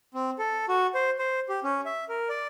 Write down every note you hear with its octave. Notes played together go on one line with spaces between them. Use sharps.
C4
A4
F#4
C5
C5
G4
C#4
E5
A#4
D5